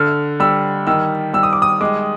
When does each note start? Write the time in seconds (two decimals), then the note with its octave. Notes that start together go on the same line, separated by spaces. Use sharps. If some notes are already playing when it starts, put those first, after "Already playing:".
Already playing: D3 F6
0.40 G3 E6
0.87 D#3 E6
1.33 G3 E6
1.43 D#6
1.53 D6
1.62 D#6
1.81 G#3 D6